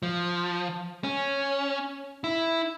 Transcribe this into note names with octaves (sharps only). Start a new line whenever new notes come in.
F3
C#4
E4